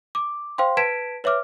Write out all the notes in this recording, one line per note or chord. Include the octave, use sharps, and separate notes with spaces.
D6
C5 F5 G5 C6
B4 A5 G#6 B6 D7 E7
B4 C#5 E5 D6 F6